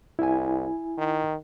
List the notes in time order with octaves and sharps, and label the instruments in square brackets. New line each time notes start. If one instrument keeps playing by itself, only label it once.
[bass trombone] C2 [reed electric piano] E4 G#5
[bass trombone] D#3